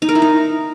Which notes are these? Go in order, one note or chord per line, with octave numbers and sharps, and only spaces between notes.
D#4
A#4
E4
D#4